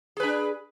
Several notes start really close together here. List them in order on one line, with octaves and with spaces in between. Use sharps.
G#4 B4 D4